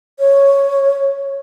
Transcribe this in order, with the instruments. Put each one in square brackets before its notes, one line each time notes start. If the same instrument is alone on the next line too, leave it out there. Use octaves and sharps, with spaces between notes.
[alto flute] C#5